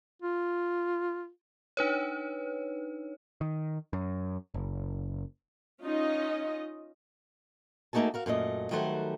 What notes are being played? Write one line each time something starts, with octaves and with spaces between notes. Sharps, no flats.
F4
D4 D#4 B4 C#5
D#3
F#2
F#1
C#4 D#4 F4 D#5
A3 A#3 D#4 F#4 G#4 A5
F#4 A#4 F5
F#2 A#2 A3 D#5
D#3 F#3 G3 A3 C5 F#5